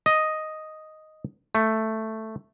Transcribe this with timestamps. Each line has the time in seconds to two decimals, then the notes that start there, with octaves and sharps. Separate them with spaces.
0.06 D#5
1.55 A3